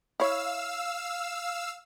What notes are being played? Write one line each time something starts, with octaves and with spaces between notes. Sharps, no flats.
E4 C#5 F5 E6